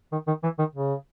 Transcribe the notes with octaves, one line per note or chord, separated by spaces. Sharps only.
D#3
D#3
E3
D#3
C#3